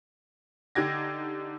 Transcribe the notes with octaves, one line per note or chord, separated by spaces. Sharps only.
D3 D#4 G4 G#6 A#6